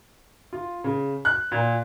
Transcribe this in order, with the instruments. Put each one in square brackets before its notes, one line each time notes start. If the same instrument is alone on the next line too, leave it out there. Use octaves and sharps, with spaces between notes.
[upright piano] F4
C#3
F#6
A#2